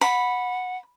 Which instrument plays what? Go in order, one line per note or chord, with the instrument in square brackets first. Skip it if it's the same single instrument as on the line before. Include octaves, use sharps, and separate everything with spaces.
[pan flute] F#5 [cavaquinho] B5